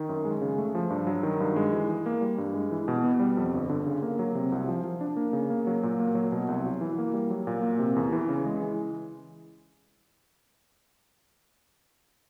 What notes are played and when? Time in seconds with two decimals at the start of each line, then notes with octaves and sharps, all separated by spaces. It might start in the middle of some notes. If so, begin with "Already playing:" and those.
Already playing: D#3
0.09 F#2
0.25 G#3
0.41 C#3
0.58 A3
0.75 F3
0.90 G2
1.07 F#3
1.23 D#3
1.40 G2
1.56 G#3
1.73 E3
1.89 E3
2.06 A#3
2.21 G3
2.38 G2
2.54 G#3
2.72 E3
2.88 B2
3.04 B3
3.20 G3
3.37 F2
3.53 G1
3.69 D3
3.86 C#3
4.02 A#3
4.19 F#3
4.35 C3
4.52 C2
4.68 F3
4.84 F3
5.01 D4
5.17 A#3
5.33 C#3
5.50 A#3
5.67 F#3
5.83 A#2
5.99 A#3
6.15 F#3
6.32 B2
6.48 C2
6.65 F#3
6.81 E3
6.98 A#3
7.14 G3
7.30 F#3
7.47 A#2
7.63 A#3
7.79 C3
7.96 E2
8.13 E3
8.29 C#3
8.46 G#3
8.62 E3